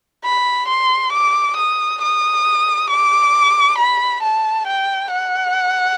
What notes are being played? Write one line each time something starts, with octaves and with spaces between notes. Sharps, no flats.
B5
C6
D6
D#6
D#6
D6
B5
A5
G5
F#5